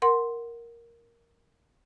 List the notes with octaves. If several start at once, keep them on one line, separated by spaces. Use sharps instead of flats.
A#4 F#5 C6